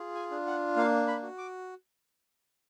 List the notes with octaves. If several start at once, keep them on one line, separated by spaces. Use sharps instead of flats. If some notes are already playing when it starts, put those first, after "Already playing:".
Already playing: F4 G#4
G#5
D4
F#5
A#3 F5
B5
F#4
D6